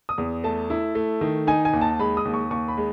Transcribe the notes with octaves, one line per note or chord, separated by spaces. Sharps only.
D#6
E2
A3 A5
E4
A3
D#3
D#4 G#5
G#5
D#2
A5
G#3 B5
D#6
D#2
C#6
D#2 C#6
B5
G#3